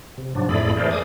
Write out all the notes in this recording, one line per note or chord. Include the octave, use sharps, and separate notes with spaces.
C3
G#2 F3 F#3 D4
F2 A2 A3 G#4 D5 B5
E3 A3 G#4 A#4 C5 D5
G#5 D6 D#6